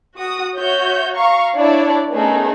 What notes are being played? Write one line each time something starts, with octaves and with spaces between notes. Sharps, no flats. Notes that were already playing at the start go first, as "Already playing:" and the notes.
F#4 D#6
F#4 C#5 E5 G6
F5 A#5 C#6
D4 E4 C#5 D5
A3 B3 C#4 D#4 G#4 A#4